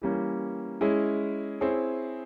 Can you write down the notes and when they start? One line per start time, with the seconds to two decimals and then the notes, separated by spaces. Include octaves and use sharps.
0.02 E3 G3 A#3 C#4
0.81 G#3 C#4 E4 G#4
1.61 C4 E4 G#4 C#5